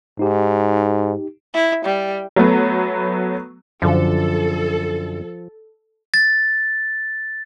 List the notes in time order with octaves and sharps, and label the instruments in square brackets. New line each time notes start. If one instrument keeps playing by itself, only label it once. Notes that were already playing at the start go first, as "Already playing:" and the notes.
[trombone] G#2 [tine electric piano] D#4 G4
[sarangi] E4
G3
[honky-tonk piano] F#3 A3 B3
[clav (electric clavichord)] F#2 D3 [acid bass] F3 [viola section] A4
[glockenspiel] A6